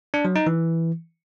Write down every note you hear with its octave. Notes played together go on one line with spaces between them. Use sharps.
D4
F#3
D#4
E3